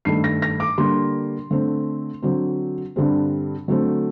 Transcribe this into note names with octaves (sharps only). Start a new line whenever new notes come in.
G2 D#3 A3 C7
A#6
A#6
D6
D3 G3 A#3 C6
D3 A3 C4
D3 F#3 C4
G2 D3 G3 C4
D3 F#3 A3 C4